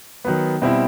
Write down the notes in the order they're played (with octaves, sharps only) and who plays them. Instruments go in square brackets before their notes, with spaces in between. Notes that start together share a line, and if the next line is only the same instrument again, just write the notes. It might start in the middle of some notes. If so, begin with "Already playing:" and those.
[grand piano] D#3 F#3 B3
B2 G3 C4 E4